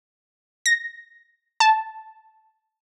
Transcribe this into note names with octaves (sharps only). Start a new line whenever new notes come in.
A#6
A5